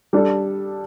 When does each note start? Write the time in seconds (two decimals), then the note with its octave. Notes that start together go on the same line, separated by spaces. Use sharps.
0.13 G3 D4 A4